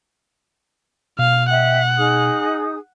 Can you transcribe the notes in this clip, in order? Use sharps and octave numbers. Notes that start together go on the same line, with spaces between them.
B2 F5
D#5 E5 F#5 G5
D#4 G#4 D#6